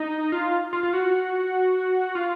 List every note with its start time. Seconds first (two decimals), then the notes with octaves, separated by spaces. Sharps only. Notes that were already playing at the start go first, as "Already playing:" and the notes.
Already playing: D#4
0.32 F4
0.73 F4
0.83 F4
0.93 F#4
2.15 F4